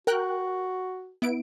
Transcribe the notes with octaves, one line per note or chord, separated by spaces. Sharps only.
F#4 A#4 G5 F#6
B3 E4 D7